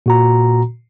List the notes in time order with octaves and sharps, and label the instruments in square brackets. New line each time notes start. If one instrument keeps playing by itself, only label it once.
[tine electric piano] A#2 F#4 A#5